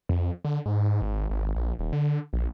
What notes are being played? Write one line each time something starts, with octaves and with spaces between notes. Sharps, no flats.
F2
D3
G#2
G#1
G#1
A#1
D#1
D3
A#1